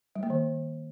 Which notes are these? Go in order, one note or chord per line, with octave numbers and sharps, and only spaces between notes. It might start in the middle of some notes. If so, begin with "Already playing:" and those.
G3
A#3
D#3